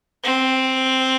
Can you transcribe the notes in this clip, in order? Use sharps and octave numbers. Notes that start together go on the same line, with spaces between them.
C4